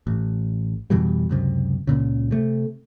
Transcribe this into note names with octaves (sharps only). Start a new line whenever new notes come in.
A1
F2 B2 E3 G3
C#2 F#2 C3
C#2 A#2 C#3
C3 A3